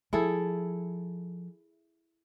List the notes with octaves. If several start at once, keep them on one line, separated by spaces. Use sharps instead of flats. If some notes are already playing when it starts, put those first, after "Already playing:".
F3 E4 G#4 A4